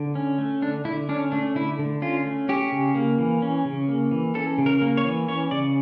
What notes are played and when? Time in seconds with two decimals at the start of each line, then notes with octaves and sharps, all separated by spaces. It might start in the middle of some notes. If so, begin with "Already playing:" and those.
Already playing: D3
0.15 C#4
0.38 A3
0.62 D3 D4
0.85 D3 E4
1.09 C#4 D4
1.32 A3 D4
1.55 D3 E4
1.79 D3
2.02 C#4 F4
2.25 A3
2.49 C#4 G4
2.72 C#3
2.95 A#3
3.19 E3
3.42 C#4
3.65 C#3
3.88 A#3
4.11 E3
4.35 C#4 A4
4.58 C#3
4.66 A#4
4.82 A#3
4.97 C#5
5.05 E3
5.28 C#4 C#5
5.51 C#3 D5